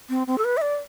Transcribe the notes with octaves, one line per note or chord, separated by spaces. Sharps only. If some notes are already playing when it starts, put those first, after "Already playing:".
C4
C4
A4
B4
E5
D5